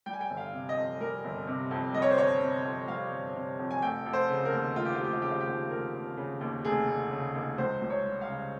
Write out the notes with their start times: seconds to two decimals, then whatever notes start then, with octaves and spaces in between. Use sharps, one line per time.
0.06 G3 G5
0.13 G#5
0.21 G5
0.30 G1
0.37 F5
0.53 C3
0.69 D#5
0.77 F2
1.00 G3 A#4
1.24 G1
1.47 C3
1.71 F2
1.94 G3 D#5
2.02 C#5
2.10 C5
2.18 G1 C#5
2.41 C3
2.65 F2
2.88 G3 F5
3.12 G1
3.35 C3
3.59 F2
3.71 G#5
3.82 F1 G5
4.06 F1
4.13 C5
4.30 C#3
4.45 A#4
4.53 D#2
4.76 F1 F4
4.85 G4
4.95 F4
5.00 F1 G4
5.13 F4
5.22 C#3 G4
5.31 F4
5.40 G4
5.46 D#2 F4
5.70 F1 A#4
5.93 F1
6.17 C#3
6.41 D#2
6.65 F1 G#4
6.88 F1
7.11 C#3
7.35 D#2
7.58 C#2 C5
7.82 C#2
7.90 C#5
8.05 G3
8.21 F5
8.29 C#3